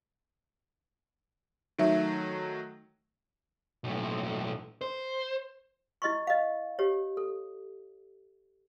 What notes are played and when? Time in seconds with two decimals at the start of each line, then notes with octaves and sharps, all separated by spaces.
1.79 D#3 F#3 A3 D#4 E5
3.84 B1 A2
4.81 C5
6.02 E4 D#5 C6 C#6
6.27 D#5 F5
6.79 G4 C#5
7.17 A4